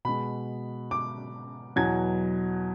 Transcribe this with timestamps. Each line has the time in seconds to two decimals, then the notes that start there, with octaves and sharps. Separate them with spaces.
0.05 B2 G#3 B5
0.91 D6
1.76 E2 B2 F#3 G#6